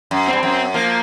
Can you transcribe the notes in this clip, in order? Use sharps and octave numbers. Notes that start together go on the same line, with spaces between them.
F#2
G2 C4
F#2
F3 A#3